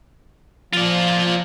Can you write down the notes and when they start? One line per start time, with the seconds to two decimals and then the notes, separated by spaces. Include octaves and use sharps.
0.73 F3 F4 D5